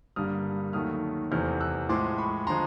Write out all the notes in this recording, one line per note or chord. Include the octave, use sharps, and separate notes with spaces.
G2 D3 G3 A#3 D#6 F6
D#2 D#3 F#3 A3 D#6 F6
E2 C3 E3 A3 F6 G6
E6 F#6
A2 F3 G#3 C6 D6
B5 C#6
D3 F3 G#3 A#5 C6